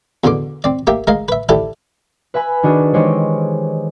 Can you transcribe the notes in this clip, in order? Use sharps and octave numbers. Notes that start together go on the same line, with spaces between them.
E2 B2 D3 C6 D6
C4 D5
A#3 G4 E5
G#3 A#4 D#5 F5
B4 E5
E4 G4 A4 D5
B4 E5 G#5 B5
D#3 D4 F#4 G#4
D#3 E3 G#3 G4 C5 C#5